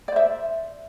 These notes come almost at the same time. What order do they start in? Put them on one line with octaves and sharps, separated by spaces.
D5 C5 E5